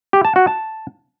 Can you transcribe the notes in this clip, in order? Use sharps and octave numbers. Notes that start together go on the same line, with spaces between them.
G4
A5
F#4
A5